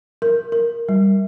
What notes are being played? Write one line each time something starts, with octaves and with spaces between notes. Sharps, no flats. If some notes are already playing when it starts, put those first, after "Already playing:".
A#4
A#4
G3